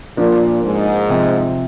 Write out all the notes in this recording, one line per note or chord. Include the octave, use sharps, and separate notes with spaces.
A#2 F3 A#3 D4 F4
G#2
C3 F3 C4